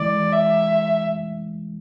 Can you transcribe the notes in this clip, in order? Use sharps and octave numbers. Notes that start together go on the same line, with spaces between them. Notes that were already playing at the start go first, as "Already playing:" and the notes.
Already playing: E3 G#3 D5
E5